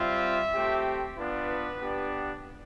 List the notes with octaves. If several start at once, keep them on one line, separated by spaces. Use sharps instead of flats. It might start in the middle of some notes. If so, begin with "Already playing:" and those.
Already playing: G3 C4 F4 E5
A3 C4 G4
B3 D4 F4 B4
B3 D4 G4